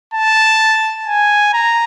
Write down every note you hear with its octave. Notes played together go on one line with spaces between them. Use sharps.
A5
G#5
A#5